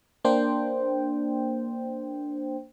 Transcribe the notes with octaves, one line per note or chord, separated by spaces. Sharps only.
A#3 D4 C5 G5